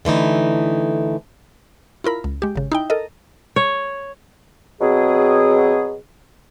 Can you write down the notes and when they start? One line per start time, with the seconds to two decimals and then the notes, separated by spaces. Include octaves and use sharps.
0.05 D3 E3 A3 D#4
2.04 E4 F4 A#4 B5
2.24 C#2
2.42 G#3 G4
2.56 G#1 C#3
2.72 D#4 E4 G5
2.90 A4 A#4 D#5
3.56 C#5
4.81 B2 F#3 C4 G#4